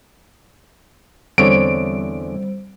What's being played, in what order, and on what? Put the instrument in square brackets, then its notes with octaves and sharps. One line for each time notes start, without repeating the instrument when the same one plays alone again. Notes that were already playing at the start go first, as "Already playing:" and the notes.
[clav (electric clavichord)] E2 D3 C#5 [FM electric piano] G3 [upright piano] C4 [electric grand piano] D7